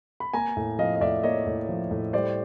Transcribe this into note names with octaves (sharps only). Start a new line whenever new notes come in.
B5
A#3 G#5 A#5
A2
F3 D#5 F5
D#5
A2 D5 E5
A#3 C#5 D#5
A2
F3
A2
G3 C5 D5